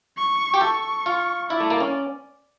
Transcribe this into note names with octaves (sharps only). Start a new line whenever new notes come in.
C#6
G4
A4 C#6
F4
E4 D5
A3
A#3
C#4